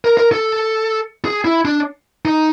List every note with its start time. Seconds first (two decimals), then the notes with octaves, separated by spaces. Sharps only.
0.05 A#4
0.17 A#4
0.32 A4
1.25 G#4
1.45 E4
1.65 D4
2.25 D#4